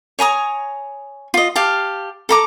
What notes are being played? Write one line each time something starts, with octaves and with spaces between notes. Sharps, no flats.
C#5 G#5 A#5 D#6
F4 D#5
G4 F5 A5
A4 A#5 D6